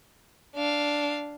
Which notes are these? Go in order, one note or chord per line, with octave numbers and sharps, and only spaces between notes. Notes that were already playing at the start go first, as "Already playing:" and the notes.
D4 F5